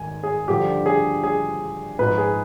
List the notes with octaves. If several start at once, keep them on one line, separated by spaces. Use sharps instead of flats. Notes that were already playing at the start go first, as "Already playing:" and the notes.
Already playing: G#2 D#3 G#5
G#4
G2 D3 F3 G4
G#4
G#4
G#2 F3 B4
G#4